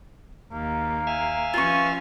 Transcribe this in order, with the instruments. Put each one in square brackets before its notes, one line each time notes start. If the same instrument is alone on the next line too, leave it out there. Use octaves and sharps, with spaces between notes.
[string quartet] D#2 [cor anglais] A#3
[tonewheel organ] E5 F5 G#5
[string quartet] F3 C#4 [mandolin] F4 B4 C#6